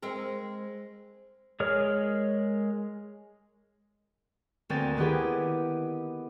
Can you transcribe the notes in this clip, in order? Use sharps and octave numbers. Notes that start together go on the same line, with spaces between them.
G#3 C4 A#4
G#3 G#4 A#4 C#5 F6
D2 A#3 C4 A#4 G#5 A6
D#3 B3 E4 G4 G#4